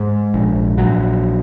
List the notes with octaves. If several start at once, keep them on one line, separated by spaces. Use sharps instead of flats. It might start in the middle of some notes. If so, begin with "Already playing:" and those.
Already playing: G#2
A#1
A#1 F#3